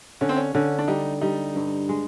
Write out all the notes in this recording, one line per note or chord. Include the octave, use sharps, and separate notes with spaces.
D3 C#4
C4
C#4
D3 C#4
D4
G3 D#4
G3 D#4
G2
G#3